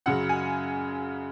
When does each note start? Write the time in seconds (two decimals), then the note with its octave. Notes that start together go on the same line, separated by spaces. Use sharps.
0.06 F#2 C#3 F#3 F#5
0.29 G#5